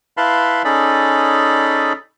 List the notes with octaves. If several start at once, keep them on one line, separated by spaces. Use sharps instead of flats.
E4 B4 F5 A5 B5 C6
C#4 D#4 G#4 A4 D5 B5